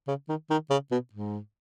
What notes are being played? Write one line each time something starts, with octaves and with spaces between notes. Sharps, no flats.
C#3
D#3
D#3
C#3
B2
G#2